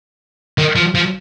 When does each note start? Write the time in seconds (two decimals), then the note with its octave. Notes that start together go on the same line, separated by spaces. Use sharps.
0.58 D#3
0.76 F3
0.95 F3